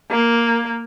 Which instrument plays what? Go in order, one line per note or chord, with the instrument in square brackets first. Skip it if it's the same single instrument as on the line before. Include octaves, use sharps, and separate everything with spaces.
[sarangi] A#3